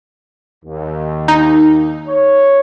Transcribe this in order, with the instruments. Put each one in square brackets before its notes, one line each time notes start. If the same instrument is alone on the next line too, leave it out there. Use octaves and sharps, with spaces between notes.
[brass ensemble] D#2
[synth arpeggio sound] D#4
[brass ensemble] C#5